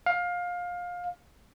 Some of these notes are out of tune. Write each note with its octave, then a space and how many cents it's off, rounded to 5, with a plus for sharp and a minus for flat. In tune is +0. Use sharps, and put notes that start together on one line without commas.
F5 +20